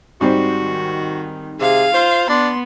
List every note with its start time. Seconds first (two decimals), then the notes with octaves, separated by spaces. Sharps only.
0.21 G#2 G3 C4 F#4
0.64 D#3
1.61 C3 G#4 F5
1.94 F4 C5
2.30 B3 D4 C6